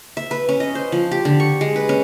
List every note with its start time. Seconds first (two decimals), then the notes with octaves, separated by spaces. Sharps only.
0.17 E5
0.31 B4
0.49 C#4
0.60 D#5
0.75 C5
0.92 F3
1.11 G4
1.25 D3
1.40 C#6
1.61 G#3
1.76 B4
1.89 C#4